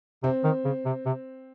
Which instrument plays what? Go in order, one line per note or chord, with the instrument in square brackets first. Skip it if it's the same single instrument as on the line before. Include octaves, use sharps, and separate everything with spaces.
[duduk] C3 [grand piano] C4
[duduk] D#3
C#3
C3
C3